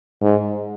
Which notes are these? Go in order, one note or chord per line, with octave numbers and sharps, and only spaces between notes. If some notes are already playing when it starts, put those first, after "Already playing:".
G#2